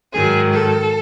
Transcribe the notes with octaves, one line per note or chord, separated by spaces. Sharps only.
G#2 D#3 F#3 G#4
A4